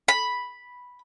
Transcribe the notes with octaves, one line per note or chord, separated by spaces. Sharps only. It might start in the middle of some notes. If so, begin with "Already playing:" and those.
B5